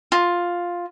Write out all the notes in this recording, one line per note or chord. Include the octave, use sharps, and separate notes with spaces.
F4